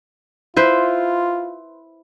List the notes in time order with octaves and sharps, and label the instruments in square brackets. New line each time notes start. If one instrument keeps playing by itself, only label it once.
[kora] E4 B4 C5 [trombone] F4